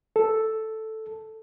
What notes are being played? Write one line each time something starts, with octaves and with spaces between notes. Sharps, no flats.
A4